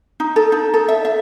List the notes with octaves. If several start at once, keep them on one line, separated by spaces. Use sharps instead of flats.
D#4
A4
D#4
A4
E5
E5